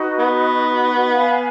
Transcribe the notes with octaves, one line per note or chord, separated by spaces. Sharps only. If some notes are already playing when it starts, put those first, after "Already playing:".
Already playing: D#4 F#4 B4 D#5
B3
B4 F5 G#5